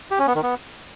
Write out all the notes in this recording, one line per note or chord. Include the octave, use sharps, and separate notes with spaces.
G4
C#4
B3
D#3
B3